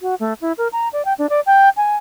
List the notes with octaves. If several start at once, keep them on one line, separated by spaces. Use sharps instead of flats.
F#4
A3
E4
A#4
A#5
D5
G5
D4
D5
G5
G#5